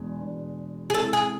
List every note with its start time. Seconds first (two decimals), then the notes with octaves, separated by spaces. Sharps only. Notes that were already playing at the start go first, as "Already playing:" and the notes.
Already playing: E2 B2 G#3 D4
0.21 E2 B2 G#3 D4
0.90 G#4
0.94 C3 G#3 C4 E4 A4
1.13 G#4